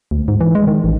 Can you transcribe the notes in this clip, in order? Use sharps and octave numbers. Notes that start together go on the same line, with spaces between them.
D2
G#2
E3
G#3
D#3
A1